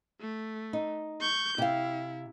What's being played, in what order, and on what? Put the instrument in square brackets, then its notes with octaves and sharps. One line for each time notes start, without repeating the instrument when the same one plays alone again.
[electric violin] A3
[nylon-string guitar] D#4
[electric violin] C#6 G6
[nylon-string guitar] C3 F5 [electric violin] E4